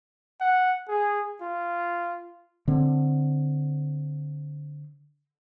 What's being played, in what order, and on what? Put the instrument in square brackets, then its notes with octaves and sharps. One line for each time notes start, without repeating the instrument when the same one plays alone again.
[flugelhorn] F#5
G#4
F4
[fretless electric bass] D3 C4